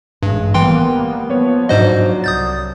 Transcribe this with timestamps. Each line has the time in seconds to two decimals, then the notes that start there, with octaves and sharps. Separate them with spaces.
0.23 A1 G2 G#3
0.54 E3 G3 A#3 B3 G5 C6
1.30 F3 B3 C#5
1.69 G#2 F#3 D4 C5 D#5
2.24 C2 D#6 G6 A6